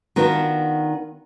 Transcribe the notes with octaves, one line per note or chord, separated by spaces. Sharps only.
D#3 B3 D4 F4 F#4 A#4